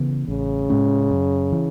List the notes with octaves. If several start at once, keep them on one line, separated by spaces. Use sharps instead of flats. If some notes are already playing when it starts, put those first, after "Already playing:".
Already playing: C#3 E3 B3
A1 C#3
A2 G#3 C#4
F#2
E3